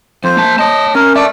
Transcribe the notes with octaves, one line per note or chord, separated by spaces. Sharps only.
F2 C5
A#3 A5
C#5 D#5 A5
C#4 A#4
D5 E5 A5